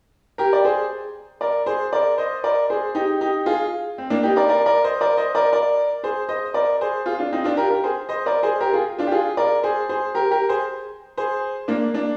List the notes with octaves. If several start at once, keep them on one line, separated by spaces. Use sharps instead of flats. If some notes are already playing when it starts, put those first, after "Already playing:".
G4 A#4
D5
G#4 C5
A#4 D5
G#4 C5
A#4 D5
C5 D#5
A#4 D5
G#4 C5
D#4 G4
D#4 G4
F4 G#4
C4
A#3 D4
D#4 G4
A#4 D5
A#4 D5
A#4 D5
C5 D#5
A#4 D5
C5 D#5
A#4 D5
A#4 D5
G#4 C5
C5 D#5
A#4 D5
G#4 C5
F4 G#4
D4 F4
C4 D#4
D4 F4
G4 A#4
G4 A#4
G#4 C5
C5 D#5
A#4 D5
G#4 C5
G4 A#4
F4 G#4
D4 F4
G4
F4 G#4
A#4 D5
G#4 C5
G#4 C5
G4 A#4
G4 A#4
G#4 C5
G#4 C5
A#3 D4
A#3 D4